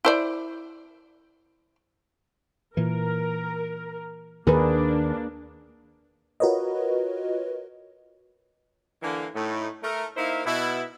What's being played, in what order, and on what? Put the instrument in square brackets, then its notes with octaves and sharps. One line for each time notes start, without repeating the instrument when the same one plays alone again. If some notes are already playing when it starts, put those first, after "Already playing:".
[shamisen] E4 C5 D5
[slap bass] A#2 E3 [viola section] A#4
[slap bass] D#2 D#3 [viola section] A#3 D4 [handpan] G#4 A#4 B4
[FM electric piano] F4 F#4 A#4 B4 C#5 D#5
[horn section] D3 E3 A#3
A2 A3 D#4
A3 A#4
A#3 D#4 E4 C5 E5 F5
B2 E4